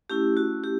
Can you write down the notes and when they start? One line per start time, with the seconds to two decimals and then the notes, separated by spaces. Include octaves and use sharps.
0.10 A3 C#4 E4 G4
0.37 F#4
0.64 G4